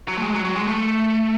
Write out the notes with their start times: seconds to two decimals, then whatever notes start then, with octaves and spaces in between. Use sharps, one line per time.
0.08 F#3
0.18 A3
0.22 G#3
0.34 F#3
0.45 F#3
0.56 G#3
0.67 A3